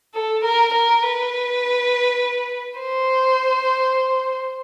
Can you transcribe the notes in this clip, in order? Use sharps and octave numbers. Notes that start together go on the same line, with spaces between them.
A4
A#4
A#4
B4
C5